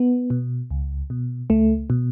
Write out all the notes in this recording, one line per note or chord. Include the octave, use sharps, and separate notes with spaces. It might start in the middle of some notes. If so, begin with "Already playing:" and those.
Already playing: B3
B2
C#2
B2
C#2 A3
B2